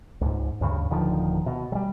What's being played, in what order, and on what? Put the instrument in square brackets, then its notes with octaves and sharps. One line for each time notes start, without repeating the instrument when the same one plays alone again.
[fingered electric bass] C#2 G#2
D2 G2 C#3
D1 D3 D#3 F3
B2
F#3 G3